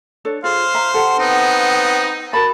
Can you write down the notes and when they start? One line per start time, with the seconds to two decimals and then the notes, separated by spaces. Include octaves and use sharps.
0.25 D4 A4 C#5
0.44 F4 G#4 C5 F5
0.74 E5 A#5
0.94 G4 A4 F#5
1.19 B3 C4 D#4
2.33 F#4 A#4 A5 B5